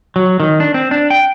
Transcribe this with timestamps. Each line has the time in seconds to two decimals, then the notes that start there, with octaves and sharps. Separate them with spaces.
0.16 F#3
0.40 D#3
0.60 D4
0.74 C4
0.91 D4
1.10 G5